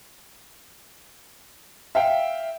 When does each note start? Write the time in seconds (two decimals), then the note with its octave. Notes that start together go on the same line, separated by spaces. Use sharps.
1.95 E5 F5 G5